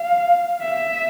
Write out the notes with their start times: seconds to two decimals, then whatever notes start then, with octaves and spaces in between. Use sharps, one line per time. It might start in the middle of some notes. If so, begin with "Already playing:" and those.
Already playing: F5
0.61 E5